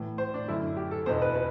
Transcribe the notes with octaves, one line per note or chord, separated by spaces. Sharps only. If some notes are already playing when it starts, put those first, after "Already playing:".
Already playing: A2 E3
C5
D4
F#2 D3 E4
G4
A4
E2 B2 C5
B4
B4